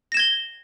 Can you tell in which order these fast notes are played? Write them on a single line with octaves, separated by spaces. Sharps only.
A#6 E7 G#6 G7